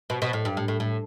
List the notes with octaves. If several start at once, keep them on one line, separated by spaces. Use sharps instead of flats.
B2
B2
A2
G2
A2
A2
A2